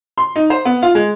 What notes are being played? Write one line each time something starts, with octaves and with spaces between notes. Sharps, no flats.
C6
D#4
C5
B3
F4
G#3